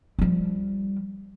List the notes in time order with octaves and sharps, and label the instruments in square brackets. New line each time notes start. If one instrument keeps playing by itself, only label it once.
[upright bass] F3 G3